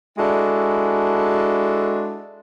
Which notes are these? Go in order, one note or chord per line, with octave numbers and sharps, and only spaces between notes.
G#3 D4 E4 F#4 A4